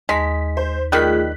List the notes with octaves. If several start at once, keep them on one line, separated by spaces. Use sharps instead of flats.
D#2 G#3 B6
C5
D#3 G3 A3 F4 G#4 F#6 B6